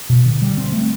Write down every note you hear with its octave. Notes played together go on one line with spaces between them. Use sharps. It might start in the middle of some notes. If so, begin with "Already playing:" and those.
B2
D3
G3
C4
A3